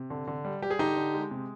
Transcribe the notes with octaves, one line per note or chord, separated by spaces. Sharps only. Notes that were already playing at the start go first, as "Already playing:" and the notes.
Already playing: C3
D3
D3
G3
G3 G4
G#4
D3 D#4 G4
D3
G#3
C3